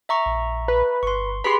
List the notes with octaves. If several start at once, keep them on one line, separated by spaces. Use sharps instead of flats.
E5 A#5 C#6
A#1
B4
G1 C6 C#6
G4 G#4 B4 B5 C6